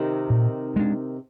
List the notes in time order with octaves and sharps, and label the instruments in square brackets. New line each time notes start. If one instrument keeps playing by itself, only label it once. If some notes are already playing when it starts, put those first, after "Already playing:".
Already playing: [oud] C3 D#3
[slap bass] A#2
G#3 D4